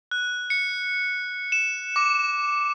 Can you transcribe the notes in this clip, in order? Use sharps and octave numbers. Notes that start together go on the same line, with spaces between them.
F#6
C#7
E7
D6